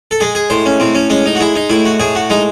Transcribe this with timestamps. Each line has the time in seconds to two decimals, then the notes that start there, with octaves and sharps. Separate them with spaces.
0.11 A4
0.20 G#3 G#4
0.35 G#4
0.50 A2 C5
0.66 C#4
0.80 A2 C4
0.95 C#4
1.10 G#3 C#4
1.26 D#4
1.35 F#4
1.40 G#3 E4
1.56 D#4
1.69 A2 E4
1.85 F#4
2.00 A2 G#4
2.15 F#4
2.30 G#3 D#4